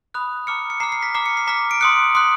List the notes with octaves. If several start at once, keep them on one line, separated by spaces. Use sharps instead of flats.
B5 D#6 F#6
A#5 D6 F6 C#7
C#7
A#5 D6 F6 C7
C7
B6
A#5 D6 F6 C7
C#7
C7
A#5 D6 F6 B6
D7
C6 D#6 F#6 C#7
C6 D#6 F#6